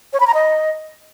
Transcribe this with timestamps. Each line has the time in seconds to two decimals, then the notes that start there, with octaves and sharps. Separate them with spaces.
0.13 C#5
0.20 B5
0.27 A#5
0.34 D#5